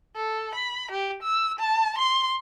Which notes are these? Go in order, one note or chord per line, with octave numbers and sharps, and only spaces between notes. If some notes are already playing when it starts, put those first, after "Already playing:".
A4
B5
G4
E6
A5
C6